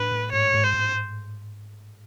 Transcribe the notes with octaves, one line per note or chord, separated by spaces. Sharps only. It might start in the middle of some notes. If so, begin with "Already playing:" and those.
Already playing: A2 D4 B4
A2
G#2 C#5
G#2
C5
G#2